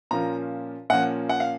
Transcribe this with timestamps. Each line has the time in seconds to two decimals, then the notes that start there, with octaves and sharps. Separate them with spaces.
0.11 A#2 F3 A#3 C#4 A#5
0.90 A#2 F3 A#3 C#4 F#5
1.29 F#5
1.40 F5